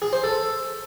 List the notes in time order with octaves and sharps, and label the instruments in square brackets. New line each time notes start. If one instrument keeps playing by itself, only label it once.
[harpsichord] G#4
C5
A4